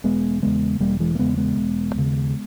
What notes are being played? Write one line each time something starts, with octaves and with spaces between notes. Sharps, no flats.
E1 G#3 B3
E2 C#3 G#3 B3
E1 G3 A#3
E3 G#3
A#3
E2 C#3 G#3 B3
G#3 B3
E1
D#2 C#3